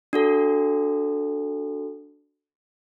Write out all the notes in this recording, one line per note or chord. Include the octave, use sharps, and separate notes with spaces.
D4 F#4 A4